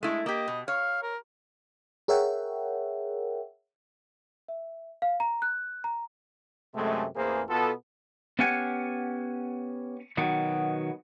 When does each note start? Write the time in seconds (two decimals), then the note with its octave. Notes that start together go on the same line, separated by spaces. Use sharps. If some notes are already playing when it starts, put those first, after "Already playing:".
0.03 G#3 A3 E4
0.26 A#3 G4 D#5
0.48 B2
0.68 C#5 F5
1.03 A#4
2.08 G#4 A#4 C#5 E5 F#5 G5
4.48 E5
5.02 F5
5.20 A#5
5.42 F#6
5.84 A#5
6.75 F#2 C3 G#3 A3
7.16 A1 E2 A#3 G#4 C5
7.48 B2 B3 F4 A4
8.39 B3 C#4 G4 F5 F#5 G#5
10.17 B2 D#3 F#3 B3